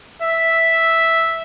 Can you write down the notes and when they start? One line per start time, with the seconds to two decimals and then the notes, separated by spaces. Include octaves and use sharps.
0.22 E5